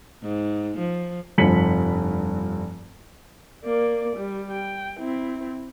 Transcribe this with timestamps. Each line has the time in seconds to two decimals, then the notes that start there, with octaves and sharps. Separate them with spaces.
0.23 G#2
0.78 F3
1.38 F1 G2 F3 B6 C#7 F#7
3.64 A#3 D5
4.16 G3
4.51 G5
4.99 C4 E4